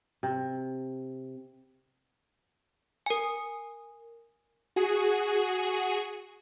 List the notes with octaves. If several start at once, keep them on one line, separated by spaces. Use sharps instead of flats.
C3
A#4 G#5
F#4 G#4